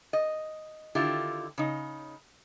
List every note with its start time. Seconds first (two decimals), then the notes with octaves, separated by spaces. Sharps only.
0.13 D#5
0.95 D3 D#3 E4 F4 G4
1.58 C#3 D#4